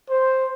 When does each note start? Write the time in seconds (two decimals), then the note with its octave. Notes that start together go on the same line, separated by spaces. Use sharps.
0.10 C5